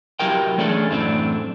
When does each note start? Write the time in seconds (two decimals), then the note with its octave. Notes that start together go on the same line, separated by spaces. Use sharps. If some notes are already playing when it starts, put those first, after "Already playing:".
0.19 F#3 E4 G4 A#4 G5
0.58 E3 A3 C#4 D4 G#4 A4
0.89 F#2 A2 E3 A3 C4 D4